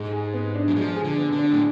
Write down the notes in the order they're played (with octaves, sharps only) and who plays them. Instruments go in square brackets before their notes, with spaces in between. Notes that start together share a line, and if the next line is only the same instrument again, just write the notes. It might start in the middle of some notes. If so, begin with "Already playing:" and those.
Already playing: [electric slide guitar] G#2 [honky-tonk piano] G#3
[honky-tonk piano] G#4
B3
D4
[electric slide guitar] F#3
[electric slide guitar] F3 [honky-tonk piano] G#3
[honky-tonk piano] G#4
[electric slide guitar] D3
[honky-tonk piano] B3
[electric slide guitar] D3
[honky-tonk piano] D4
[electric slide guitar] A2